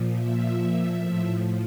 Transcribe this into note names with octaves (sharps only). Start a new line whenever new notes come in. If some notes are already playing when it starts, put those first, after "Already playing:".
Already playing: A#2 F3
E5
A2 F3